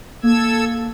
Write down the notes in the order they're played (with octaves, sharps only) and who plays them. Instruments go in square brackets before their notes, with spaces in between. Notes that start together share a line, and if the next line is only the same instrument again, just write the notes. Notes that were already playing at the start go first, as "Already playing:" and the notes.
[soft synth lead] A#3 [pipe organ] A4 E6 G#6